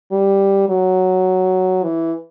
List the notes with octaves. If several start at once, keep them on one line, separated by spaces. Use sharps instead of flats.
G3
F#3
E3